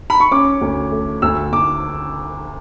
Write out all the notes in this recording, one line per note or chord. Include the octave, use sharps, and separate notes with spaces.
B5
C#6
C#4 D6
D2
A3
D2 E6
D2 D6